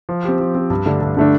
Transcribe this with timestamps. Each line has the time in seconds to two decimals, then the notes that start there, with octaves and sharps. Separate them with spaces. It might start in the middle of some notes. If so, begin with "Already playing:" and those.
0.09 F3
0.25 C4 G4
0.40 F3
0.55 C4 G4
0.70 G2
0.86 D3 A3 D4
1.01 G2
1.17 D3 A3 D4